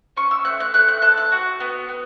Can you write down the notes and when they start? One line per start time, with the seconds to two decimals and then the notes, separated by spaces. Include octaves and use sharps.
0.17 C#4 C#6
0.31 E6
0.45 A3 F#6
0.60 F#6
0.74 A3 F#6
0.88 F#6
1.02 A4 F#6
1.17 F#6
1.32 F#4
1.60 B3
1.88 B3